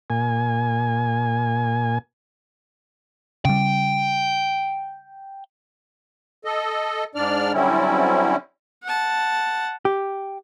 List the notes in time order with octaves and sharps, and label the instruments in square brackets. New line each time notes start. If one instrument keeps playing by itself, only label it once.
[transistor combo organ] A#2 G#5
[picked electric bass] C#3 G3 [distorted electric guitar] G5
[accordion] A4 D#5
G#2 D4 D5 F6
D3 F#3 G3 C4 C#4 E4
[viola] F#5 A5
[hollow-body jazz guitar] G4